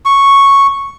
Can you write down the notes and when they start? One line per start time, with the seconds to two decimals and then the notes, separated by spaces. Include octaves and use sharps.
0.05 C#6